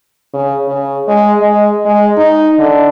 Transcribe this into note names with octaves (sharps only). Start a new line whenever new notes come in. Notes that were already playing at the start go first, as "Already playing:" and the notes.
C#3
C#3
G#3
G#3
G#3
D#4
D3